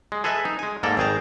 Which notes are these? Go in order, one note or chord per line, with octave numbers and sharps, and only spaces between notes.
G#3
G#4 A4 B4 D#5 E5 G#5
D#4
G#3 G#5
G#2 A#3 A4 D5 A#5
G#1 D#3 G#4 G5 A5 A#5